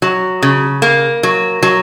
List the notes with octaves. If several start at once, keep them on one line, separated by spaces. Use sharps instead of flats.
F#3
C#3
A#3
F#3
F#3